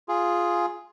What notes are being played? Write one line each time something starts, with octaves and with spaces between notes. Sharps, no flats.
F4 G#4